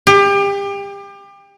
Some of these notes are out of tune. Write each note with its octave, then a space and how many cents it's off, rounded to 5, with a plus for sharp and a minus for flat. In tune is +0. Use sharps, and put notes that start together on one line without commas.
G4 +30